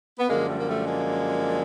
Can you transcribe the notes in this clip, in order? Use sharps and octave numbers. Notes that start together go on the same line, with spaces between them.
B3
F#2 D3 F3 G#3 A#3
G3 A3
A#3
G3 A3
G#3 A#3